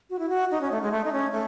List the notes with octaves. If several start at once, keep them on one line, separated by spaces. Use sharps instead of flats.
F#4
E4
F#4
D#4
C#4
A3
G#3
A3
D#4
C#4
A3